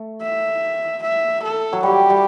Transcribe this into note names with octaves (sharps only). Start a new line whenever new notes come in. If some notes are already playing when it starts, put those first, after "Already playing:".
Already playing: A3
E5
E5
A4
F#3
G3 G4
G3